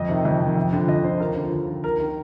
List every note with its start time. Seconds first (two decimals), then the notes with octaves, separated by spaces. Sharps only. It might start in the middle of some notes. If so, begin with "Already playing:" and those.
Already playing: F2 D#5
0.09 C3 D#3
0.25 F2
0.40 C3 D#3
0.57 F2
0.73 D3 F3
0.88 F2 D#5
1.04 D3 F3 C5
1.20 D#2 A#4
1.36 D3 F3
1.52 D#2
1.68 D3 F3
1.84 D#2 A#4
2.00 D#3